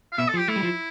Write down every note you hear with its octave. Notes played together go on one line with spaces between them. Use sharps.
F5
B2 E5
A4
F3
G4
A3 E4
G3
F3